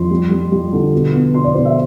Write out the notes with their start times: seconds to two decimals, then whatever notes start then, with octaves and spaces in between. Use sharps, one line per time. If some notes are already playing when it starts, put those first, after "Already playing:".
Already playing: F2 C6
0.11 G3
0.31 G3
0.52 G3
0.73 D3
0.93 B2
1.13 B3
1.34 B2 C6
1.44 D5
1.54 B2 C5
1.65 E5